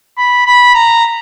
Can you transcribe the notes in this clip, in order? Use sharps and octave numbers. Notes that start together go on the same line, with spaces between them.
B5
B5
A#5